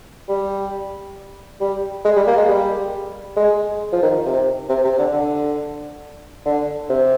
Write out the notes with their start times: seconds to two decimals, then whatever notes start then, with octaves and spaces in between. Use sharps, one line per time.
0.29 G3
1.60 G3
2.05 G#3
2.16 G3
2.27 A#3
2.38 G#3
2.48 G3
3.37 G#3
3.92 F3
4.03 D#3
4.15 D#3
4.25 C3
4.69 C3
4.85 C3
4.98 D3
5.13 D3
6.45 D3
6.89 C3